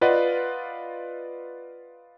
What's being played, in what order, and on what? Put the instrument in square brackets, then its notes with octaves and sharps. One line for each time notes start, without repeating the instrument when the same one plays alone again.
[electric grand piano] F4 B4 D5 D#5 F5 F#5